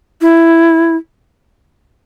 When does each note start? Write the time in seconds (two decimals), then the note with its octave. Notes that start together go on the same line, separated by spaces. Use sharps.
0.21 E4